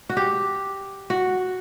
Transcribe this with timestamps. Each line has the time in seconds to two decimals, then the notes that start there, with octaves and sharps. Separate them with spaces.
0.09 F#4
0.17 G4
1.10 F#4